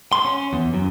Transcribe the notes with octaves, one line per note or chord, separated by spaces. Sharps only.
C6
C#4
E2
F#2